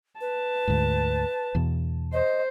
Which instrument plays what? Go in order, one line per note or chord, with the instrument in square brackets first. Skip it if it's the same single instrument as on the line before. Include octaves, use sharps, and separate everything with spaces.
[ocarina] B4 [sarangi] A5
[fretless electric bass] D2 G#2
E2 B2
[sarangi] C5 [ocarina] D#5